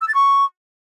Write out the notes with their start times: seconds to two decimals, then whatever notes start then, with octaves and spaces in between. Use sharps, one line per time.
0.01 E6
0.07 A6
0.14 C#6